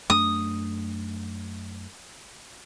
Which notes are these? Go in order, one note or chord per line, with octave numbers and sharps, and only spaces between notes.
F#2 A3 D4 D#6